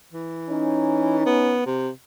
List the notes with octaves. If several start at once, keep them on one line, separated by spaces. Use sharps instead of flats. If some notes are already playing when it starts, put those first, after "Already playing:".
E3
C#4 D#4
B3
C3